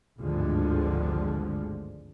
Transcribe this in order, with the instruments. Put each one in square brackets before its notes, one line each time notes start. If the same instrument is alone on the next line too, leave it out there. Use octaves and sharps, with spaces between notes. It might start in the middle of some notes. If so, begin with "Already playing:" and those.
[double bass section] G#1 D2 G2 D3 F3 G#3